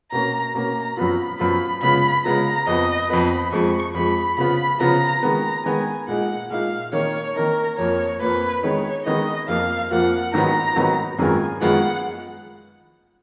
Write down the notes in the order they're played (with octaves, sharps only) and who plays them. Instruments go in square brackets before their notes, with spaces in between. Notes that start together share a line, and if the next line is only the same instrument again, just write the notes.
[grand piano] B2 A#3 C#4 [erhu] A#5
[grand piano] B2 A#3 C#4 [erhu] A#5
[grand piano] F#2 F3 B3 F4 [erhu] B5
[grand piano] F#2 F3 B3 F4 [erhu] B5
[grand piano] C#3 G#3 B3 F4 [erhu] B5
[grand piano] C#3 G#3 B3 F4 [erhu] A#5
[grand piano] F2 F3 B3 [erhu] D#5
[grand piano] F2 F3 B3 [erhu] B5
[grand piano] F2 F3 G#3 [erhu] C#6
[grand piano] F2 F3 G#3 [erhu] B5
[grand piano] C#3 F3 B3 F4 [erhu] B5
[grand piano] C#3 F3 B3 F4 [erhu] A#5
[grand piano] D#3 G#3 B3 [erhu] A#5
[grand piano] D#3 G#3 B3 [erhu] G#5
[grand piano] A#2 G#3 D#4 [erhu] F#5
[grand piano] A#2 G#3 D#4 [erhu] F5
[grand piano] D#3 A#3 D#4 [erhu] C#5
[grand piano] D#3 A#3 D#4 [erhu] A#4
[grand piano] F2 F3 A#3 [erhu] C#5
[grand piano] F2 F3 A#3 [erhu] B4
[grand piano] D#3 G#3 B3 D#4 [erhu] C#5
[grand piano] D#3 G#3 B3 D#4 [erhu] D#5
[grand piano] F2 F3 A#3 F4 [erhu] F5
[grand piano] F2 F3 A#3 F4 [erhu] F#5
[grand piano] G#2 D#3 F#3 B3 D#4 [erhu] A#5
[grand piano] G#2 D#3 F#3 B3 D#4
[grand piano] F#2 D#3 G#3 B3 F4 [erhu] G#5
[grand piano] F#2 D#3 G#3 B3 F4 [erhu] F#5